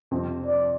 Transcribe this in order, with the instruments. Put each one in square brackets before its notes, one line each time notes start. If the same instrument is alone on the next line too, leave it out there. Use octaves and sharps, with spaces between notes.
[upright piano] F2 C3 F3 C4
[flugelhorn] D5